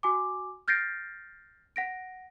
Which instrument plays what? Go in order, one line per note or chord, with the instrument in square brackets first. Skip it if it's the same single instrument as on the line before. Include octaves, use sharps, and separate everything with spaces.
[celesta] F#4 G#5 D6
F6 G6 A6 A#6 C7 D7
F#5 A#6 D7